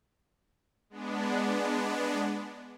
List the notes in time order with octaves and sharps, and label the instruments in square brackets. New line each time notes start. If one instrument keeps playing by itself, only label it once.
[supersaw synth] G#3 B3 D4